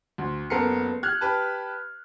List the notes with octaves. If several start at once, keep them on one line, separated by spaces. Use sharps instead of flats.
D2
F#1 B3 A4 A#4 C7 C#7
F6 F#6 G#6
G4 B4 A5